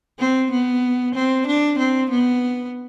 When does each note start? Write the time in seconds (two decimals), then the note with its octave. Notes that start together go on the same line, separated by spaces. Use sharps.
0.19 C4
0.51 B3
1.15 C4
1.47 D4
1.79 C4
2.10 B3